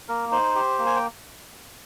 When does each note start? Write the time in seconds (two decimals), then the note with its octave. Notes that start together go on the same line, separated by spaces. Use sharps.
0.08 A#3 A#4
0.31 D#4 C5
0.55 G4
0.79 A#3
0.86 G#5
0.96 G5